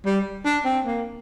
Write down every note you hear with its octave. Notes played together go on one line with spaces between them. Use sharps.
G3
D4
C4
A#3